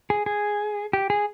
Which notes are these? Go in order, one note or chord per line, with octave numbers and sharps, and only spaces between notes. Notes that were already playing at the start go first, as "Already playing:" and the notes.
G#4
G#4
G4
G#4